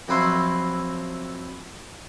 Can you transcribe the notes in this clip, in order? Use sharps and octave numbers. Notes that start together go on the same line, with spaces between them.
F2 F#3 E4 B4 C6